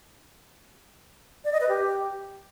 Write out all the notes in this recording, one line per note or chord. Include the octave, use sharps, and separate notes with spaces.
D5
D#5
B4
G4